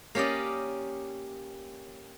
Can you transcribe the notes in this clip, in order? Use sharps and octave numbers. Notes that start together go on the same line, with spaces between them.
A#3 C#4 G4 D5 D#5